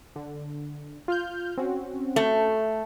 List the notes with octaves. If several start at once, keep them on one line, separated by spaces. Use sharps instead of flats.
D3
F4 F6 G6
C4 C#4 F#4
A3